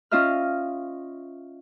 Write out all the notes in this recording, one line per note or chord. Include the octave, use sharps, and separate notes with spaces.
C#4 F4 D#5 E5 F6